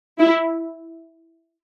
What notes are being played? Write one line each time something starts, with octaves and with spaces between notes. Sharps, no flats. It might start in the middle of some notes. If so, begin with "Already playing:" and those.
E4